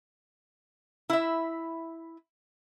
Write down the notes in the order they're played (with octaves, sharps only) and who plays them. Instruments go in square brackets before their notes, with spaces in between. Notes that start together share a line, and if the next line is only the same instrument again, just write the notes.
[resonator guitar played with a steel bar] E4 E5